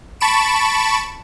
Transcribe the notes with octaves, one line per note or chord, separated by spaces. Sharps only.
A5 B5 C#6 D7 E7